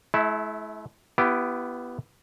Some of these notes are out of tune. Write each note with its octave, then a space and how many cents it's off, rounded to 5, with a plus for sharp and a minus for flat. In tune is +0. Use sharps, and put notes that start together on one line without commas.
A3 -45 E4 -5
B3 +0 E4 +30 G4 -10